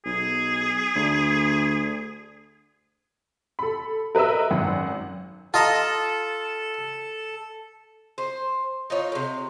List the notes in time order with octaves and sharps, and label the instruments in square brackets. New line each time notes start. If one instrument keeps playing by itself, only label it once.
[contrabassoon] B1 [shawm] G#4
[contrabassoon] D2
[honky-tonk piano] A4 B5
A#4 B4 D#5 E5 E6
G#1 F#2 F#5
[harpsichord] F4 D#5 A#5 [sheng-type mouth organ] A4 [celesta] A5
[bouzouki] C5
D#4 F4 C#5
A2 C3